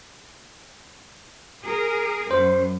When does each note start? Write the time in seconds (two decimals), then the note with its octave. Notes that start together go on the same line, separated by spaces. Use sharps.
1.64 G#4 A#4
2.31 F#2 C5